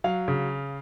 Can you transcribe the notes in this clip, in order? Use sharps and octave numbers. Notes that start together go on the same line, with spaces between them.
F#3 F5
C#3